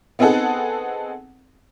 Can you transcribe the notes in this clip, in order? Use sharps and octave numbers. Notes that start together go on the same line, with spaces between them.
B3 C4 D#4 G#4 A4 F#5